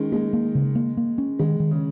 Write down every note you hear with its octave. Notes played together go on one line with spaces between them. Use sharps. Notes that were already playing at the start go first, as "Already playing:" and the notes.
Already playing: D#3 G#3 C#4
G#3 A#3
A#3
C#3
A#3
A#3
C#4
D#3 G#3
D#3
C#3